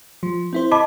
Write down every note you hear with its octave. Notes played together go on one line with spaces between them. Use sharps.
F3
C4 E4 C5
D#5 A5 B5 D6